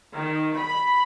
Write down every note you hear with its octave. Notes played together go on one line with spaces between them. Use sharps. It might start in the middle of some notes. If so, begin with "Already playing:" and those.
D#3
B5